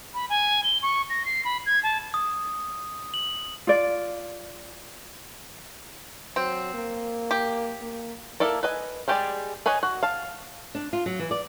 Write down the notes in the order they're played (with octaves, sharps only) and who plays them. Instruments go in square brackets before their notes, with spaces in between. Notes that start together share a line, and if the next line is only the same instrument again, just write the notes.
[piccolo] B5
G#5
G7
C#6
A#6
C7
B5
G#6
A5
[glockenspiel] D#6
F#7
[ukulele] F4 D5
[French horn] F#3 [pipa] C4
[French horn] A#3
[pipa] G4
[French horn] A#3
[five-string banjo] A#3 E4 A4 D5
B4 D#5 G#5
G3 G#3 G4 G#4 D5
G#4 B4 C#5 D#5 G#5
F#4
F5 A5
[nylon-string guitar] D4
F4
F#3
E3
D5